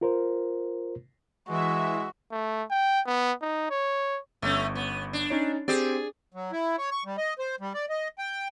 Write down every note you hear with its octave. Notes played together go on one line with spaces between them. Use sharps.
F4 A#4 C5
E3 G#3 F#4 E5
A3
G5
B3
D#4
C#5
G1 A3 C#4
B3
D4
C#4 D#4 C#5
C4 G4 G#4 C5 D5
F#3
E4
C#5
C#6
G3
D#5
C5
G3
D5
D#5
G5